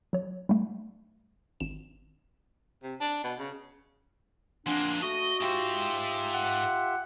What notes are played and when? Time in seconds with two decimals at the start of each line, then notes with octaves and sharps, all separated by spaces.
0.13 F#3 C#5
0.49 G3 A3
1.60 G#1 E7
2.83 C3
3.01 D4
3.24 B2
3.39 C#3
4.67 F2 A#3 D4 F#5 G#5 C6
5.02 A3 F#4 D#5
5.41 G#2 F4 G4 C5 E5
6.34 F#5